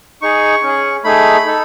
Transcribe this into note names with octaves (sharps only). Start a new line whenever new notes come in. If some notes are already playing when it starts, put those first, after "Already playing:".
D#4 G#4 C#6
C#4
G#4
A3 D#4 G#4 B5
D#4 A4